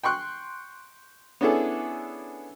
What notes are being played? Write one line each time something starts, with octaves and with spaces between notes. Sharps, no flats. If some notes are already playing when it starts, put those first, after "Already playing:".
G5 C6 C#6 F#6
B3 C#4 D4 E4 G#4 A4